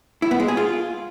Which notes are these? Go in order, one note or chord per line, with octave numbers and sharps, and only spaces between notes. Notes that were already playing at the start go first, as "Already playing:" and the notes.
E4
B3
G#3
G#4
F4